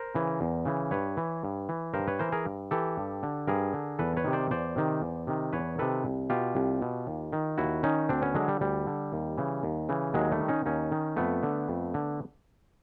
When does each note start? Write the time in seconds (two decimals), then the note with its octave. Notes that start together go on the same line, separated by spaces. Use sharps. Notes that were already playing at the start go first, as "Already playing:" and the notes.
Already playing: A#4 C5
0.15 C#3 E3
0.41 E2
0.65 C#3 E3
0.91 G2 B4 C#5
1.17 E3
1.44 G2
1.69 E3
1.94 G2 A#4 C5
2.07 B4 C#5
2.19 E3 A#4 C5
2.32 G#4 A#4
2.46 G2
2.71 E3 G4 A4
2.97 G2
3.23 D3
3.47 G2 G#4 A#4
3.73 D3
3.99 E2 A4 B4
4.17 B4 C#5
4.24 C3 D#3
4.33 C5 D5
4.51 E2 C5 D5
4.76 C3 D#3
5.02 E2
5.27 C3 D#3
5.53 E2 B4 C#5
5.78 C3 D#3 A4 B4
6.05 C2
6.30 B2 F4 G4
6.55 C2
6.82 B2
7.07 D#2
7.33 D#3
7.58 D#2 E4 F#4
7.83 D#3 C#4 D#4
8.09 D2 C4 D4
8.22 B3 C#4
8.35 D3 F#3 G#3
8.48 G3
8.61 D2 G3
8.87 D3
9.13 D#2
9.38 C#3 E3
9.63 D#2
9.89 C#3 E3
10.14 D#2 F#3 G#3
10.32 G3 A3
10.40 D#3
10.48 C#4 D#4
10.66 D#2 C#4 D#4
10.92 D#3
11.17 F2 A3 B3
11.43 D3
11.69 F2
11.94 D3